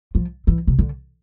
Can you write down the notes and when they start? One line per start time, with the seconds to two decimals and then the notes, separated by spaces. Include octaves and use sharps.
0.15 F3
0.47 E3
0.67 C3
0.79 D3